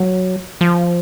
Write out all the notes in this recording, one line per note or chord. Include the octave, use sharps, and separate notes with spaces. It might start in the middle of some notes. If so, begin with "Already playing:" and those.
Already playing: F#3
F3